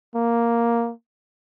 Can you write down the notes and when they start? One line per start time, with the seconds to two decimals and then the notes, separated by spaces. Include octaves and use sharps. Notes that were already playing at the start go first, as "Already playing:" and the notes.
0.15 A#3